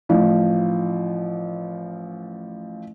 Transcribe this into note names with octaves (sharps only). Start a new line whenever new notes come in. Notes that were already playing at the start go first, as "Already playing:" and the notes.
A1 F3